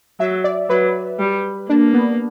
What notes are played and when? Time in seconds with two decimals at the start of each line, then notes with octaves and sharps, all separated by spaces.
0.19 F#3 E5
0.44 D5
0.69 F#3 B4
1.19 G3
1.69 A#3 D4
1.94 B3